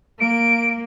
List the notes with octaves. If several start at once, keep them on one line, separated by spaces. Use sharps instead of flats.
A#3 D7